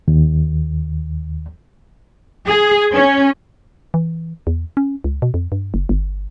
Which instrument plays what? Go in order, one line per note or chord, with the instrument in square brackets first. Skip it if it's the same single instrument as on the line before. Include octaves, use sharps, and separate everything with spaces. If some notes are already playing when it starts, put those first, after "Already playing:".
[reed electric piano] D#2
[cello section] G#4
C#4
[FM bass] E3
E2
C#4
C#2
B2
F2
G2
F#1
G1